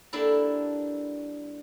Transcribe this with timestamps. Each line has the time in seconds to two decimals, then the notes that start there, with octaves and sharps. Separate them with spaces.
0.13 G3 A#3 D4 E4 A4